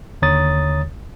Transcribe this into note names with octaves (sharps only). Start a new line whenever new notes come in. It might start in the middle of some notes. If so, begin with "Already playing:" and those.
D#2 D3 C#5 A#5 D#6 A6